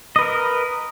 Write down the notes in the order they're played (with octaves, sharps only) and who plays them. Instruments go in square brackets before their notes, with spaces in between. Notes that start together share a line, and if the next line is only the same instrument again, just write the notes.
[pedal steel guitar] D#5
B4
A#4